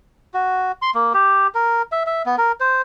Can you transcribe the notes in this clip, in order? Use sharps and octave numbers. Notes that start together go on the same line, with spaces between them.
F#4
C6
A#3
G4
A#4
E5
E5
B3
A#4
C5